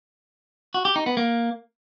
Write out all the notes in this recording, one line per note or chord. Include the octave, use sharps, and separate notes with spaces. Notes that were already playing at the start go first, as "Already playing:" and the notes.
F#4
G4
D#4
B3
A#3